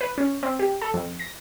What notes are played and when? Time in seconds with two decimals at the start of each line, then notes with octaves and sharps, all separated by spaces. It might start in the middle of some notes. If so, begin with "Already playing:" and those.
0.01 B4
0.18 C#4
0.43 C4
0.59 G4
0.81 A4
0.94 F2
1.19 A#6